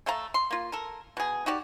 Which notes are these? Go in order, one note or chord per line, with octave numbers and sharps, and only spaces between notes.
A3 A4 F5 A#5
C6
A#3 F4
A4 A#4
B2 G#4
D#4 F#4 G4 D5